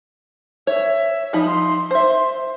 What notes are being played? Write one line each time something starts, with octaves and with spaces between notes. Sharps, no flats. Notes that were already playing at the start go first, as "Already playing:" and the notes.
C#5 E5
F3 D#4 B5
C6
C5 E5